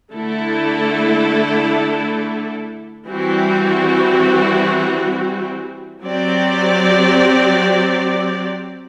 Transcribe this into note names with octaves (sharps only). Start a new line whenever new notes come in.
D3 A3 E4 A4
E3 G3 C4 F#4
F#3 C4 G4 D5